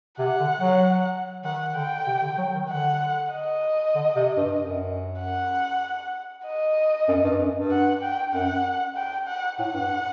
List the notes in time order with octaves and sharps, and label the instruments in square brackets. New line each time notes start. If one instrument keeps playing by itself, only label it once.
[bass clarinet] C3 [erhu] F#5
[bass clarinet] D3
F#3
[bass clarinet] D#3 [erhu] F#5
[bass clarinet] D3 [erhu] G5
[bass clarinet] C3
D3
F#3
D#3
[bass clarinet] D3 [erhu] F#5
[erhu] D#5
[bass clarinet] D3
C3
G2
F#2
[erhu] F#5
D#5
[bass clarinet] F#2
G2
F#2
G2
[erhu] F#5
G5
[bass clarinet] F#2 [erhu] F#5
[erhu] G5
F#5
[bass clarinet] A2 [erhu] F#5
[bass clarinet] G2